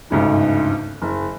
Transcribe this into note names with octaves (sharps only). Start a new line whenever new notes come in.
G1 D2 G#2 C#3
F#1